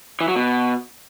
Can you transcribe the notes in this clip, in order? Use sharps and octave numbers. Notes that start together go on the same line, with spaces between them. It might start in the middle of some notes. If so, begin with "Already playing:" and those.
E3
F#3
B2